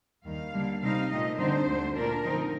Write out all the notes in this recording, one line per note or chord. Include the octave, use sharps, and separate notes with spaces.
D#2 D#3 G3 F5
D3 G3 A#3
C3 G3 C4 D#4 F5
A#2 A3 C4 D#4 D#5
D3 G3 C4 D#4 C5
D2 D3 A3
A#2 A3 D4 A#4
D3 F3 C4 D#4